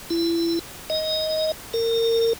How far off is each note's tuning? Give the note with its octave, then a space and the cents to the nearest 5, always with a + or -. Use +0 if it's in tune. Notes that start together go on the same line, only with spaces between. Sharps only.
E4 +30
D#5 +15
A#4 -30